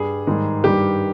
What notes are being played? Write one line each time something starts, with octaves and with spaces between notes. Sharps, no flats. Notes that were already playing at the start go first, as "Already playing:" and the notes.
Already playing: G2 G3 G#4
G#2 D#3 G3
G2 D#3 G3 G4